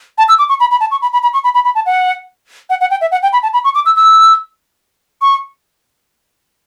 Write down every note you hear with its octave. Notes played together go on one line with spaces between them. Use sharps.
A5
E6
D6
C#6
B5
B5
A5
C#6
B5
B5
B5
C#6
B5
B5
B5
A5
F#5
F#5
F#5
G5
E5
F#5
G5
B5
A5
B5
C#6
D6
E6
E6
C#6